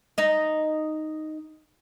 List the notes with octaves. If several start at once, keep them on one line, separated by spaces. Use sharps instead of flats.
D#4 D#5